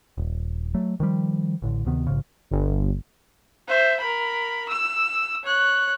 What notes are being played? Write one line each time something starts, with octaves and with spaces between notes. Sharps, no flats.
D#1
F#3 A3
D#3 F3 G3
A1 A2 D3
D2 C3 D#3 B3
A#1 G#2 C#3
G1
C5 E5
A#4 B5
E6
C#5 F#6